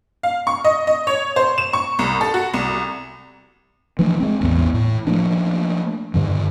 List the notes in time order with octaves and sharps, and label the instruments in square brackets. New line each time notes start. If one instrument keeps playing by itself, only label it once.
[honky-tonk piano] F5
C#6
D#5
D#5
C#5
C5
E7
C#6
C2
A4
F#4
C2
[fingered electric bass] E3 F3 A3 D4
G#3 C4
A1 E2 E3 B3
A2
F3 A3 A#3 D4
G2 D3 D#3